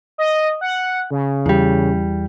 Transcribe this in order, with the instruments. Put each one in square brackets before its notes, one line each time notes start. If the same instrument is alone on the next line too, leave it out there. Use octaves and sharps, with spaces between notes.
[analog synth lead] D#5
F#5
C#3
[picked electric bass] E2 G3